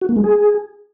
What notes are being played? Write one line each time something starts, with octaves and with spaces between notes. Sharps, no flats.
F#4
A#3
G#3
G#4